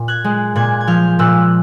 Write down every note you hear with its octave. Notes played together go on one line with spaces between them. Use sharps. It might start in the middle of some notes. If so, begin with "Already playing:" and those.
Already playing: A#2
F#6 G#6
G#3
A#2 F#6 G#6
G#6
F3 F6 G6
A#2 E6 F#6